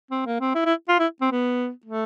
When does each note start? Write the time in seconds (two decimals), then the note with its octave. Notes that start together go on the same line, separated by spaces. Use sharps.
0.11 C4
0.26 A#3
0.40 C4
0.55 E4
0.66 E4
0.88 F4
0.99 E4
1.21 C4
1.32 B3
1.86 A3